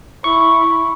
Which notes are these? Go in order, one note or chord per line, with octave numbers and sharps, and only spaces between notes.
E4 C#6